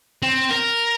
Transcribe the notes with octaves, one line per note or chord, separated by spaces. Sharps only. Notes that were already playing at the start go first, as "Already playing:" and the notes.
C4
A#4